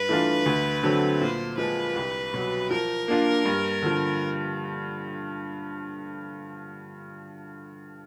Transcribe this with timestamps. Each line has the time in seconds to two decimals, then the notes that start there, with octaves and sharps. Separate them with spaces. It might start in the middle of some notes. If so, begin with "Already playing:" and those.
Already playing: G2 B4
0.09 E3 A3 D4 F4
0.46 D2
0.83 D3 F#3 A3 C4
1.21 A#2 C5
1.58 F3 G#3 B4
1.96 C2
2.34 B2 F#3
2.71 F3 A#4
3.08 A#3 D4 F4
3.45 G2
3.82 D3 F3